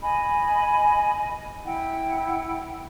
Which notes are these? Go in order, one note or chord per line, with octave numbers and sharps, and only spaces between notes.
D#5 G#5 B5
E4 F#5 G5